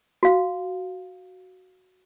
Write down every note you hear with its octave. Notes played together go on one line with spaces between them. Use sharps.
F#4 F5